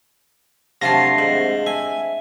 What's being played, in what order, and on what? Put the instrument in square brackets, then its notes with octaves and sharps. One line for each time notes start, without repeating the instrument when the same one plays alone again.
[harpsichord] C3 F4 [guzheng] F#3 A3 D4 [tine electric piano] A#6 C7
[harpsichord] G#2 [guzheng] C4
[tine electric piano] E5 [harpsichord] G#5